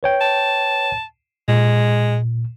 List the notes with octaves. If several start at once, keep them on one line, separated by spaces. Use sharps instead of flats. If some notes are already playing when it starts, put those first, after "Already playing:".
B4 C#5 G5
A5
A#2 G#3